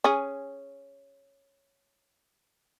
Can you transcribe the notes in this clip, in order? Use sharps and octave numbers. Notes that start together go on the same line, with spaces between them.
C#4 G#4